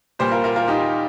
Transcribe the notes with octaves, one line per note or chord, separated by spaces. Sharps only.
A#2 G3 G4 C5
F4 A#4
F4 A#4
F4 A#4
D#4 G4